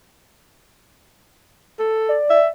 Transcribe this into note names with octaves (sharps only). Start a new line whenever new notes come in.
A4
D5
E5